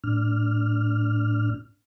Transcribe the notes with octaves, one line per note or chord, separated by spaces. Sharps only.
A2 D4 F6